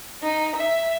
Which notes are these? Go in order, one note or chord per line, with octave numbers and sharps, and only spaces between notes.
D#4
E5